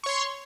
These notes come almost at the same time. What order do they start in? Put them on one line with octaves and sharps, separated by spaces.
C#6 C#5 C6